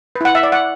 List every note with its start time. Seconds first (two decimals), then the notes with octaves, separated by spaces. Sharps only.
0.15 B4
0.21 E4 F#5
0.35 E5
0.43 D5
0.52 F#5